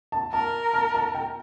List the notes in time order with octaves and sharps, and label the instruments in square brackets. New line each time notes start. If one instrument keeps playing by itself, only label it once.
[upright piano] A5
[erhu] A#4 [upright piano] A5
[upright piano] A5
A5
G5